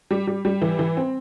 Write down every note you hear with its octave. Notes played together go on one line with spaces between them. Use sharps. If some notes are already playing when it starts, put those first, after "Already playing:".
G3
G3
G3
E3
E3
C4